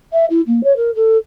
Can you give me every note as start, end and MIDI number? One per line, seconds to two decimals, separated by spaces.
0.12 0.25 76
0.30 0.41 64
0.46 0.63 58
0.63 0.75 73
0.76 0.90 70
0.95 1.16 69